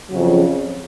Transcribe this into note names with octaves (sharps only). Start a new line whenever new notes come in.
F2 C#3 F#3